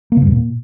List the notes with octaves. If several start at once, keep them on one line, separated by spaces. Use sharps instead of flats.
A#3
C#3
G2
E2
A#2